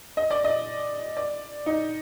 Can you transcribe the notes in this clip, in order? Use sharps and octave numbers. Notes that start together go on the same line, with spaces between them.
D#5
D5
D#5
D5
D#4